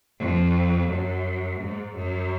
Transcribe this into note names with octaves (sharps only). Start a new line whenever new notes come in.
F2
F#2
G#2
F#2